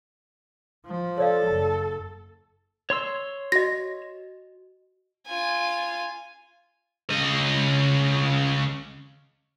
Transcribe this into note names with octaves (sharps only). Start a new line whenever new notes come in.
F3
A4 C#5 D5 F5
F#1 A5
C#5 C6 E6
F#4 D#5 A#6
F4 G#5
C#3 D#5